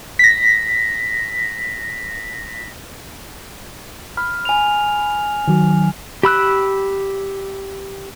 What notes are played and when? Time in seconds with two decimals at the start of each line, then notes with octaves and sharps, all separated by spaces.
0.19 A#6 B6
4.17 B5 F6
4.45 G#5 F7
5.48 D#3 F#3
6.23 G4 B5 E6 F#6